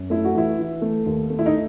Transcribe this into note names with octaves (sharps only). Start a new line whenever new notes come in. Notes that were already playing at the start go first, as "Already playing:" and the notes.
Already playing: F#2
A3 E4
F#4
E3 E4
E3
A3
D#2
A3
E4
D#4